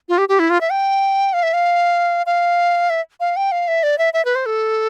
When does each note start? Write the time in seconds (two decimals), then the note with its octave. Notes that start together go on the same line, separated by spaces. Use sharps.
0.09 F4
0.18 G4
0.29 G4
0.39 E4
0.50 F4
0.61 E5
0.71 G5
1.33 F5
1.43 E5
1.53 F5
2.26 F5
2.90 E5
3.20 F5
3.36 G5
3.52 F5
3.68 E5
3.83 D5
3.98 E5
4.14 E5
4.25 B4
4.35 C5
4.46 A4